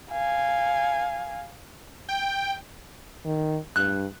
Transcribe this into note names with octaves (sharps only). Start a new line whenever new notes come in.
F5 G#5
G5
D#3
G2 F#6